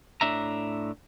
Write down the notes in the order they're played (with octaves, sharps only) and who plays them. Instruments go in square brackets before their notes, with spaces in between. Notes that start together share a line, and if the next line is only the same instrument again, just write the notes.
[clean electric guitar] A2 D4 E5 A#5